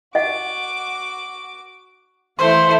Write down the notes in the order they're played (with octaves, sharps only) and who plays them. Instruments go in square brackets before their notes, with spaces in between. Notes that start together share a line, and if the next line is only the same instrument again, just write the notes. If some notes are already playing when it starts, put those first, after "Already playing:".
[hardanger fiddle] F#4 D6 [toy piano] D#5 F#5
[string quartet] E3 A3 E4 [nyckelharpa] C5 [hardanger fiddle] F5 [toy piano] C6